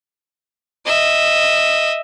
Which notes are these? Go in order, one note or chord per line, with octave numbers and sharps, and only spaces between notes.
D#5 E5